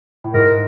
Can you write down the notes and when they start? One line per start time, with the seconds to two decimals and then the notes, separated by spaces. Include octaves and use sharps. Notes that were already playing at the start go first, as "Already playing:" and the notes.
0.24 A2
0.33 G#2 A#4